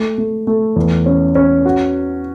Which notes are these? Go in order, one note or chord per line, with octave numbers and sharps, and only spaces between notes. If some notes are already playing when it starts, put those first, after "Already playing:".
Already playing: A3
A3
A3
E2
C#4
C#4
F#4